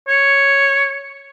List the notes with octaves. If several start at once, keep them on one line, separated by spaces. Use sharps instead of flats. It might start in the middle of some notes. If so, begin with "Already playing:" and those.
C#5